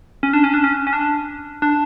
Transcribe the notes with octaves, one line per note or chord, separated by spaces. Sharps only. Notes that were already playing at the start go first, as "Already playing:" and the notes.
C#4
D4
C#4
D4
C#4
C#4
D4
D4